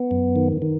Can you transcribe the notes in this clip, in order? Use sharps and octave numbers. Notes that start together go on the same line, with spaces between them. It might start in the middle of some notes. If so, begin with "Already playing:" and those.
Already playing: B3
F#2
D#3
D#3